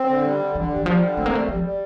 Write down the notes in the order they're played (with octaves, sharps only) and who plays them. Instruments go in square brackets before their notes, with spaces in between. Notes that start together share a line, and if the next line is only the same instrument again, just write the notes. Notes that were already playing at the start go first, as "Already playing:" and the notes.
Already playing: [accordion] C4
D3
G3
D3
[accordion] D3 [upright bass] E3
[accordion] G3
[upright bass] E3
[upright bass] F3 [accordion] G3
[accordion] D3
[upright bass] A3 [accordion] C4
[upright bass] A#3
[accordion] G3 [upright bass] A3
[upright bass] F3 [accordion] G3
[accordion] G3